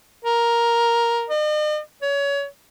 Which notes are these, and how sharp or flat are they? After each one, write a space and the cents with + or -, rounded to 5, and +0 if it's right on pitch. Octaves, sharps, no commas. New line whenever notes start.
A#4 +5
D#5 -45
C#5 +25